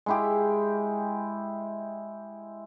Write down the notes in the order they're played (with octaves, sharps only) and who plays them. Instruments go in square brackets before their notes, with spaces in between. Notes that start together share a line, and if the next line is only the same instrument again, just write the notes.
[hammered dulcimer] G#3 E4 G4